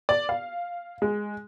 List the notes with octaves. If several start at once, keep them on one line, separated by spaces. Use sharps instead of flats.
D5
F5
G#3